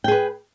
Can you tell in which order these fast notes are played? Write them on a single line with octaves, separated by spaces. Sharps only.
G5 G#4 B4